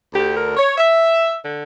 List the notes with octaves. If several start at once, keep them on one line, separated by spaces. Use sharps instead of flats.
D2 D3 G4
A#4
C#5
E5
D3